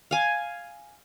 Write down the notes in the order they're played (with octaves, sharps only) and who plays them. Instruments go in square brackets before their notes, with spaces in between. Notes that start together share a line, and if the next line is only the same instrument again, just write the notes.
[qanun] F5 G#5